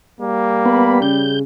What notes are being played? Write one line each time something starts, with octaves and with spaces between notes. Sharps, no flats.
G3 A#3
B3 B5
C#3 G6